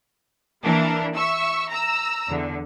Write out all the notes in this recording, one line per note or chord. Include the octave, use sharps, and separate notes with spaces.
E3 A#3 D4 A#4
E5 C#6 E6
A#5 E6
E2 D3